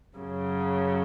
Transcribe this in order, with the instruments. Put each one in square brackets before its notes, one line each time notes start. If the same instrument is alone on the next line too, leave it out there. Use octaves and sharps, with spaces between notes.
[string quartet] F#2 C#3 F#3